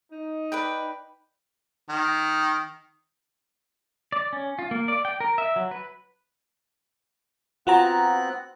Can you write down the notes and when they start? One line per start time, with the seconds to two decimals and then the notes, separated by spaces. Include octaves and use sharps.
0.11 D#4
0.52 B4 D5 G5
1.89 D#3
4.12 D5
4.33 C#4
4.59 F4
4.71 A#3
4.88 D5
5.05 G5
5.20 A#4
5.38 E5
5.56 F#3
5.71 B4
7.67 B3 C4 F4 F#4 A#5 F#6